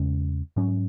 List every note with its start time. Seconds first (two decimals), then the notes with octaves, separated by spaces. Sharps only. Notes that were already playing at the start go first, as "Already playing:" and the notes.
Already playing: E2 C#3 G#3 C#4
0.57 G#2 F#3 C#4